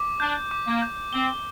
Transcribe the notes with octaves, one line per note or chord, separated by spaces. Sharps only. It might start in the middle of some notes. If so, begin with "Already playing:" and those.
Already playing: D6
D4 G6
D6
A#3
G6
C4 G7